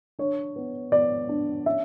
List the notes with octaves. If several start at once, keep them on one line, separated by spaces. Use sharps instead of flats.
D4 C#5
B3
B3 D5
D4
C#4 E5